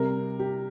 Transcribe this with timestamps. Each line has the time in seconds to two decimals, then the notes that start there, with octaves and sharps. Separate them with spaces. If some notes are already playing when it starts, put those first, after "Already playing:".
Already playing: C3 G3 A#4
0.39 G4